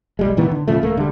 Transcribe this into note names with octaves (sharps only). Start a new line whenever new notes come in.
B1 G3 G#3
A2 D#3 E3 B3
D3
A#2 C#3 F3 A3
D#1 A3 A#3
D3 G3